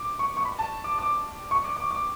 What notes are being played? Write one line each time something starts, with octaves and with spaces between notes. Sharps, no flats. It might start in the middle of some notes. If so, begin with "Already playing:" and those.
Already playing: D6
C#6
C#6
B5
A5
D6
D6
C#6
D6
D6
D6